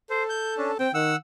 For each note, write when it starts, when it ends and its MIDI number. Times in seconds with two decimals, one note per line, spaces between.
0.10 0.77 69
0.10 0.23 72
0.29 0.54 91
0.57 0.71 61
0.57 0.71 62
0.79 0.89 60
0.79 0.91 79
0.94 1.15 51
0.94 1.16 78
0.94 1.16 88